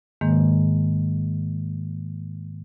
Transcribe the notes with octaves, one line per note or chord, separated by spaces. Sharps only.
G#2 D#3 G#3 A#3